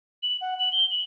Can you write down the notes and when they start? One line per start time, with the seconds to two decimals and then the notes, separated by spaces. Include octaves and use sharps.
0.23 F#7
0.41 F#5
0.59 F#7
0.72 G7
0.90 F#7